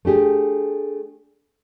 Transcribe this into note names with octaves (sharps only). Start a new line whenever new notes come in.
A3 D4 G4 G#4